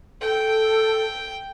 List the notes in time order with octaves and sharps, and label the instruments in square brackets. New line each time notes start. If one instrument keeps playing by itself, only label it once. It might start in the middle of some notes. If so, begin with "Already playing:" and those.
[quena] A4 [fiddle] G5